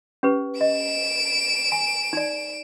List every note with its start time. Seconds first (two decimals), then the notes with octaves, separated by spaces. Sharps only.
0.23 C#4 G4 B4
0.61 D#5 D7 E7
1.72 G#5
2.13 D#4 D5